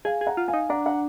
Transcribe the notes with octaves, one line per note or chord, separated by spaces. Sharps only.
G#4 F5 G#5
G#4
F#5 A#5
F4
F5 G#5
D#4
D4 F#5 A#5
F#5 A#5